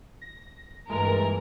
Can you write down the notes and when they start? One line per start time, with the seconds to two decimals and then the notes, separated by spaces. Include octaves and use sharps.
0.22 A#6
0.89 G2 A#2 E3 G#3 A3 A#4